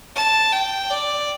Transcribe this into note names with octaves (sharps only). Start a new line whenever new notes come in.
A5
G5
D5